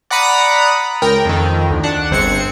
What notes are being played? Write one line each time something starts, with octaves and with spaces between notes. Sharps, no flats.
D5 F#5 A#5 B5 D#6
C#2 A#4 G5
F2 D#3
D2
D4 F#5
G1 C4 G#4 C#7